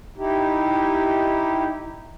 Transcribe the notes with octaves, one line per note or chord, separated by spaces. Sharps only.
D#4 E4 G4